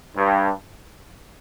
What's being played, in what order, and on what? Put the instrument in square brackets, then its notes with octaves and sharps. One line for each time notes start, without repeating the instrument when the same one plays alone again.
[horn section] G2